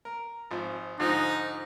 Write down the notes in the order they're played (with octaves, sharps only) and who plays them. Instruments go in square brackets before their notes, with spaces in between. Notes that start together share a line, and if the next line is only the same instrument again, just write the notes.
[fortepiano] A#4
G#1 F3
[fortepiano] G#2 D3 F3 [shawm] D#4